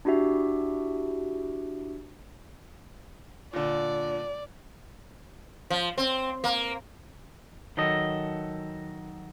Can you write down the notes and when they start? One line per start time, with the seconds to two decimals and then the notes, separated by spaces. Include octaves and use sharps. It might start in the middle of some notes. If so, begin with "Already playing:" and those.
0.05 D4 E4 F#4 G4 E5
3.53 A#2 D3 D5
5.70 F3
5.98 C4
6.44 A#3
7.77 D#3 F#3 A4 D#5